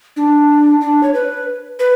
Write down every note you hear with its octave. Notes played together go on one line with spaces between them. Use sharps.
D4
D4
C#5
B4
B4